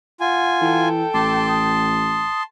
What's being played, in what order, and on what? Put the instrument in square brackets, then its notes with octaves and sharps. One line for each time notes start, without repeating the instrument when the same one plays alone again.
[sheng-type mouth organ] F4 G#5 [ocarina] F#5
[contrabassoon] E3 [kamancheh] A4 G5
[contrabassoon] A1 [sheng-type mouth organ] A5 C6 [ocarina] D6
[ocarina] D#6